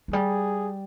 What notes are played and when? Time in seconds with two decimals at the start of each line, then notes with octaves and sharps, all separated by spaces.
0.08 F3
0.13 G3 G#4